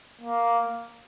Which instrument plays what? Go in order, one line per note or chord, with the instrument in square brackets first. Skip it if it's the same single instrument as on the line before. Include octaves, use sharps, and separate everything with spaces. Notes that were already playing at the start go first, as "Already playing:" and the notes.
[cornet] A#3